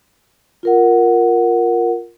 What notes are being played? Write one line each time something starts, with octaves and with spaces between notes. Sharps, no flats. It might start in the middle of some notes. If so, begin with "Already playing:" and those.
F4 A#4 F#5